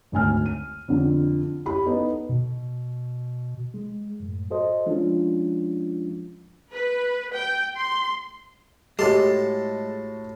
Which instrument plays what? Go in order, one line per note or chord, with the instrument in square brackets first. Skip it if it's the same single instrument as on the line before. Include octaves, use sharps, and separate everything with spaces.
[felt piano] G#1 D2 G#5 F6
D#7
F2 D3
E4 G4 B5
B3 D#4 A4
[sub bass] B2
[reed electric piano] G#3
F#2 A2
F#4 A4 C5 D#5
F3 G#3 C#4 D4 F4
[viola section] B4
G5
C6
[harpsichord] A2 A5 C6 [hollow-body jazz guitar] G#3 [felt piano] F#4 A4 [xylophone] G4